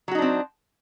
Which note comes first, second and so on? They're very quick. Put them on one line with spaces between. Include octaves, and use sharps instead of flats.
F#3 F#4 D#4 D4 C4